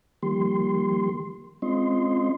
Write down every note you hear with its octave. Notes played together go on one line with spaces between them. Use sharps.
D#3 F3 G3 A#3 G4 C6
G#3 C4 C#4 F4 D#5 C6